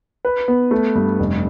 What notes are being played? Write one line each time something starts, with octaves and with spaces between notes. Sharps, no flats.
B4
B3
A3
G2
F1